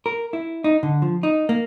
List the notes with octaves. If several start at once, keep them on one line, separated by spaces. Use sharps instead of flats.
A#4
E4
D#4
D3
F3
D#4
A#3